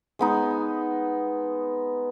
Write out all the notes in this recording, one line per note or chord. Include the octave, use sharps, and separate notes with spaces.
G#3 B3 D#4